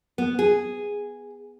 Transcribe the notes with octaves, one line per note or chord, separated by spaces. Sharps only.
B3
G#4